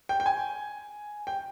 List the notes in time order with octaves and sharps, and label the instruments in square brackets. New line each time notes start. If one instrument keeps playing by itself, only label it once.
[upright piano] G5
G5
G#5
G5